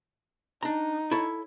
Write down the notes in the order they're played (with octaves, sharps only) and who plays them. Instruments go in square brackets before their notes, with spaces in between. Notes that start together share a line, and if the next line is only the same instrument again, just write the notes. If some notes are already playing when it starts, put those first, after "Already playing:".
[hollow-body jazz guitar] D4 A#5 [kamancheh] D#4
[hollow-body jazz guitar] E4 A4 C#5